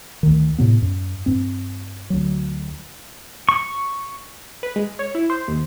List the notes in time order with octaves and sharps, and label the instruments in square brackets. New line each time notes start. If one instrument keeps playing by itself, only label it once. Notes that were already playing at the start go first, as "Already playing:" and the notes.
[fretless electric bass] D2 D#3
A2 C3 B3
F#2
G2 C4
D2 F#3
[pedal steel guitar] C#6
[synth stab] B4
G#3
C#5
E4
C5
D#2